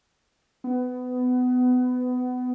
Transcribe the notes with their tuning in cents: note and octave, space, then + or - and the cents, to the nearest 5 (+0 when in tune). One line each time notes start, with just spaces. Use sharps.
B3 +25